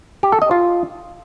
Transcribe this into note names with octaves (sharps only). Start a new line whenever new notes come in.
G4
A4
D#5
F4